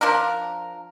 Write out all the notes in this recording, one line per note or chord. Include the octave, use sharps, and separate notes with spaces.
F3 D4 A#4